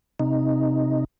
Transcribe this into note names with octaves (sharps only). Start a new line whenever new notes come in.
C3 D#4